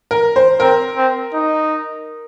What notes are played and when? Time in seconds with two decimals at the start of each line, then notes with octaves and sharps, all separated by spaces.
0.11 A#4
0.36 C5
0.60 C4 A#4
0.97 C4
1.34 D#4